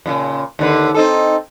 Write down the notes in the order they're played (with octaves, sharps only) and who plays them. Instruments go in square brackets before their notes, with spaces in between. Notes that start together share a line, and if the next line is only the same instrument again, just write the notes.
[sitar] F2 A#2 C#3
D#2 D3 B4
C4 D#4 A4